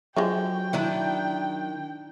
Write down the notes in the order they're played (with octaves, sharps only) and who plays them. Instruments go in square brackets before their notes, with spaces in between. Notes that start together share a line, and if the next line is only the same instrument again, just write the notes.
[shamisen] D3 F3 G#3 [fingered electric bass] F#3 [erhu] G5
[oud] D#3 D4 E4